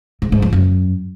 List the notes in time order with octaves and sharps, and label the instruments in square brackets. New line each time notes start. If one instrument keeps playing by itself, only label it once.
[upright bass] G#2
G#2
F3
F#2